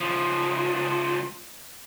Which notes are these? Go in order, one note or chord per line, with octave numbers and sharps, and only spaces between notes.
C#2 F3